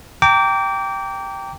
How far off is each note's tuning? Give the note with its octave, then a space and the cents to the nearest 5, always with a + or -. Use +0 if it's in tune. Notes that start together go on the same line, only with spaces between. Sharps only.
G5 +0 A#5 -30 D6 -25